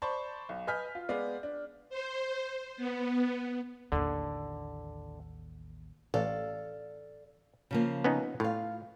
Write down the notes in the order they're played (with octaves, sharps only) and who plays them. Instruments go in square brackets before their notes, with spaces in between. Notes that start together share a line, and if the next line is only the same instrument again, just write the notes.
[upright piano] C5 D5 A5 B5 C#6
B1
B4 D#5 G#5 F6 G6 B6
F4
G#3 B3 D5 F5
D4
[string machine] C5
B3
[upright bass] A1 D#2 [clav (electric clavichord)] D3
[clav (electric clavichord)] A1 [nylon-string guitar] A4 D5 F5
[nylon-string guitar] C#3 F3 A#3
[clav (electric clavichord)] B3 C#4 D#4
[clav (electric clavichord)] A2 [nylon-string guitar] F4 F5